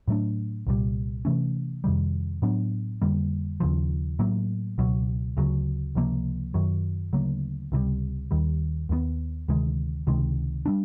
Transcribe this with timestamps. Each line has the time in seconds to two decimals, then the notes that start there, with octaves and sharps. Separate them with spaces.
0.08 A2 F#3 A3 D4
0.67 C2 A#2 G3
1.25 C3 E3 A3 C#4
1.84 F2 C3 D#3 G3
2.42 A2 F#3 B3 D4
3.02 F2 D3 G3 A#3
3.60 D#2 C#3 F3
4.19 A2 F#3 A#3
4.78 C#2 B2 F#3
5.37 D2 C#3 F#3
5.95 C#2 C3 F3 A#3
6.54 F#2 D#3 F#3
7.13 D2 C#3 F#3 A#3
7.72 C#2 C3 D#3 G3
8.31 D#2 D#3 G3
8.89 D#2 D#3 G3 B3
9.48 D2 C3 D#3 G#3
10.07 C#2 C3 D#3 G#3
10.66 G3 A#3 D4